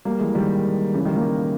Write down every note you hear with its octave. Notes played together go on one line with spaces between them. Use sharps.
G3 A#3
E3 G#3
D#3 G3
C#3 E3
D#3 G3
G3 A#3